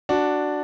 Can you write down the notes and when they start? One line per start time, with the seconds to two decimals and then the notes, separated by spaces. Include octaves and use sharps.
0.09 D4 F#4